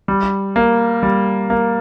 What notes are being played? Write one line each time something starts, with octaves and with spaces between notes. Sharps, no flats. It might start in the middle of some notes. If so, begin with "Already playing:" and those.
G3
A#3
G3
A#3